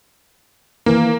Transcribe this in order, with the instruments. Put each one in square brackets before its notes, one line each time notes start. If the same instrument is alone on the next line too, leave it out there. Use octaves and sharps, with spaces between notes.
[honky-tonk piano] E3 [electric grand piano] A#3